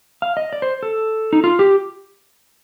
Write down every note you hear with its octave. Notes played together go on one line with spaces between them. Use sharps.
F5
D#5
D5
C5
A4
D#4
F4
G4